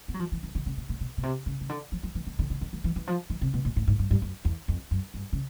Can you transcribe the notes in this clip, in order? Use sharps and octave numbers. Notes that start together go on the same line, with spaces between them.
B3
F#3
F3
E3
E3
D3
C#3
B2
A#2
B2
B2
C3
C#3
C#3
D3
F3
F3
E3
D#3
D3
D3
D#3
E3
E3
E3
F3
E3
C3
B2
A#2
A2
G#2
G2
G2
F#2
E2
F2
F#2
G2
C#3